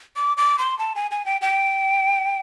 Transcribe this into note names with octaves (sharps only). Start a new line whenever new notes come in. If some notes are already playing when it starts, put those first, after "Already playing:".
D6
D6
C6
A5
G#5
G#5
G5
G5